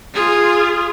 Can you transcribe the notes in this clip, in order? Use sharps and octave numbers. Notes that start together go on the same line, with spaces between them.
F4 G#4